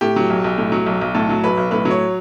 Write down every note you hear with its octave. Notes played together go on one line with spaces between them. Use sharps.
A2 G4
F#3
B1
B1
A2
F#3
B1
B1
A2 A4
F#3
B1 B4
B1
A2 B4
F#3
C#5